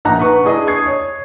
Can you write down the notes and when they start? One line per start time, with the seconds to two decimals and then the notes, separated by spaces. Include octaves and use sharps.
0.05 A#1 D#4 F#5 A#5
0.19 B4 C#6
0.44 D4 E4 G#4 D#5
0.67 C#6 D#6 G#6 C7
0.86 C#5